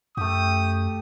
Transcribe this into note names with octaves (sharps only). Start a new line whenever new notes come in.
F#2 A3 G4 D#6